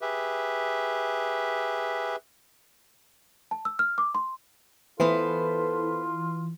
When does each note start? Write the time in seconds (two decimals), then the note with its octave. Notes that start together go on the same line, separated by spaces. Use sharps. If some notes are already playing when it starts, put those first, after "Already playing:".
0.01 G4 G#4 B4 E5
3.51 A5
3.65 E6
3.79 F6
3.98 D6
4.15 C6
5.00 E3 B3 F4 A4 B4 C5